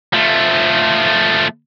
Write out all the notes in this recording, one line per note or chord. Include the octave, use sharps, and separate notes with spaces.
F3 A3